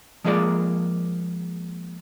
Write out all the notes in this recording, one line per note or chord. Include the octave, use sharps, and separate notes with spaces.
F3 G#3 A#3 G#4 D5